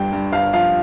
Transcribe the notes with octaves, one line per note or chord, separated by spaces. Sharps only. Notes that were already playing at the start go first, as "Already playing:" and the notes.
Already playing: G1 G2 G5
G2
G1 F5
F3 F5